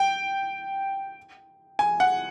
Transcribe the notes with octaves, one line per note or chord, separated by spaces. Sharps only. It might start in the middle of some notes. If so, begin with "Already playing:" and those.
Already playing: G5
G#5
F#5